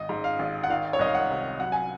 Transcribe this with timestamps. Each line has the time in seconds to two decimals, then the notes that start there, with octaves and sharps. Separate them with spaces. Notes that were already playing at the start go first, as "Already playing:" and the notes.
Already playing: G#1 D#5
0.09 G#2
0.24 F5
0.39 G#1
0.63 F#5
0.70 D#3 F5
0.93 C#5
0.99 C2 D#5
1.07 F5
1.15 F#5
1.30 C3
1.60 F#3 F#5
1.72 G#5